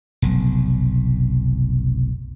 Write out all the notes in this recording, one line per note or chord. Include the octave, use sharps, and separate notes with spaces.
F1 B1